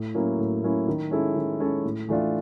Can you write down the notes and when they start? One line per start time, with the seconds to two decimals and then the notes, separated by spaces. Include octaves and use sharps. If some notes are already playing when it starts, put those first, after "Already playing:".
Already playing: A2
0.14 F#3 A#3 C#4 E4
0.38 A2
0.62 F#3 A#3 C#4 E4
0.88 D#3
1.11 G#3 C#4 E4 A4
1.35 D#3
1.60 G#3 C#4 E4 A4
1.85 A2
2.09 E3 A3 D4 F4